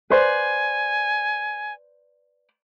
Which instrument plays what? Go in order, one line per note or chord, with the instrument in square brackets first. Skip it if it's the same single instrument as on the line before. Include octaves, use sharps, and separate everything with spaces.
[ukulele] B4 C5 D5 [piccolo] G#5